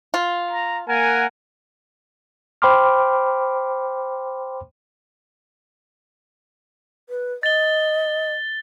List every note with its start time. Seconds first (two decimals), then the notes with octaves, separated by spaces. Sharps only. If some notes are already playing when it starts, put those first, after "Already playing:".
0.14 F4
0.51 A#5
0.89 A#3 A#4 F#5 G#5
2.62 C5 G5 B5 C6 D6 F6
7.09 B4
7.43 D#5 A6 G7